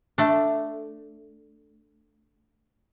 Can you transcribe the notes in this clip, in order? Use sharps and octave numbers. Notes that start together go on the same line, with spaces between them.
A3 D4